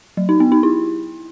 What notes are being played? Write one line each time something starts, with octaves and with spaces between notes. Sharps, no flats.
F#3
D#4
B3
D#4
E4